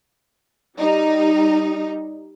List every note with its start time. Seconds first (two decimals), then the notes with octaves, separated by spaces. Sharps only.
0.78 G3 D#4